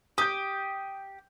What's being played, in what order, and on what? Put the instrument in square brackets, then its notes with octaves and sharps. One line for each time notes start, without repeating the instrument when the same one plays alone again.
[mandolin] G4 [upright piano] D#6 G6